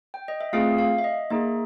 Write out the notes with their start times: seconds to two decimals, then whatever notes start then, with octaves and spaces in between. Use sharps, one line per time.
0.14 G5
0.28 D#5
0.41 E5
0.53 A3 C4 F4 G#4 F5
0.78 F5
0.98 E5
1.04 D#5
1.30 A#3 D#4 G#4 E5